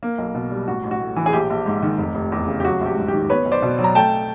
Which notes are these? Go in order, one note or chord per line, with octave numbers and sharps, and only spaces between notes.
A#3
B1
B2
G3
A1 F#4
A1
F#4
A2
E3
G#4
A#1 G4
A#1
G#2
D#3
F1
F1
E2
C#3
G4
F#3 F#4
A#1 G4
G#2
G4
D#3
B3 B4 C#5
B1
C5 D5
B2
F#3
A#5
A3 G5 A5